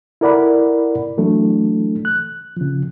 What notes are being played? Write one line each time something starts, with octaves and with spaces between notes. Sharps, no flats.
E4 A4 A#4 D5 F#5 B5
E3 F#3 A3 D4 A4
F#6
C#3 F3